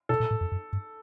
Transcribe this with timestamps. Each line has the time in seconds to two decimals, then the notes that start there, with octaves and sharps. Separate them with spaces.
0.09 B2 A4
0.20 A#2
0.31 A2
0.41 F2
0.52 F#2
0.73 G2